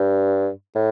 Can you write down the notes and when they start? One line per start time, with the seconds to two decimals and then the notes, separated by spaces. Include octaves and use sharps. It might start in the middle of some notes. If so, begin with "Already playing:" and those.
Already playing: G2
0.75 A2